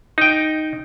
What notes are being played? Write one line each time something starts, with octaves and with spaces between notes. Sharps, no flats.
D#4 G5